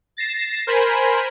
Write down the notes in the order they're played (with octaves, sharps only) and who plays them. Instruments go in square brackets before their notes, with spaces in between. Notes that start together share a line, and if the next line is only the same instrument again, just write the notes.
[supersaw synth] A6 A#6 C7 E7
A#4 C5 G#5 B5